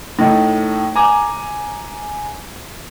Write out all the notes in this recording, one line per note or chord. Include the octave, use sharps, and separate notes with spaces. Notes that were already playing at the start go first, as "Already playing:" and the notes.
A2 D#4
G#5 A#5 D6